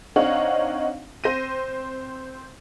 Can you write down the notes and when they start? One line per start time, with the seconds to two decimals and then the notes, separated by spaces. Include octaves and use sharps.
0.16 C4 D4 D#4 C#5 F5 F#5
1.24 C4 C5 A#6 D#7